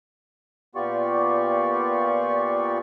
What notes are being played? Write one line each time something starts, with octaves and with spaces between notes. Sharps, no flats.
A#2 B3 F4 G4 D5 C#6